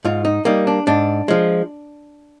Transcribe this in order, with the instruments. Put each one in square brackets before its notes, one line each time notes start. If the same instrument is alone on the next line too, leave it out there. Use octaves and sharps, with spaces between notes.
[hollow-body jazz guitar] G#2 F4
D#4
G3 A#3 D#4
D4
G#2 D4
F3 G#3